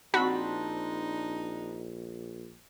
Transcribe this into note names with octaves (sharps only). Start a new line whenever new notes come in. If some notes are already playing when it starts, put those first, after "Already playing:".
A#1 C4 D4 D#4 F#4 B5